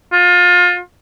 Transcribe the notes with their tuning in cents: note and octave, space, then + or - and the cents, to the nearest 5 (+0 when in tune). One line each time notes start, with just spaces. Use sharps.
F4 +30